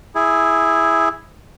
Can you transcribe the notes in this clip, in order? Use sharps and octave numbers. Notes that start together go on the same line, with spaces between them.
E4 G#4